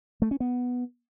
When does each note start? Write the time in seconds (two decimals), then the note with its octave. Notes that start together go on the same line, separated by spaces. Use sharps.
0.22 A3
0.31 C#4
0.40 B3